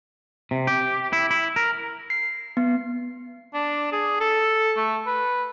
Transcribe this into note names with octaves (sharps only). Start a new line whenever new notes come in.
C3
G4
E4
E4
A#4
C7
B3
D4
G#4
A4
A3
B4